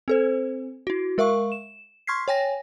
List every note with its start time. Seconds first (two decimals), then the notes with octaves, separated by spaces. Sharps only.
0.08 C4 A4 C5
0.87 E4 F#4
1.18 G#3 A#4 E5 F5 C#6
1.52 E7
2.07 C6 C#6 F6 G#6 B6 C7
2.28 C#5 G5 G#5 A#6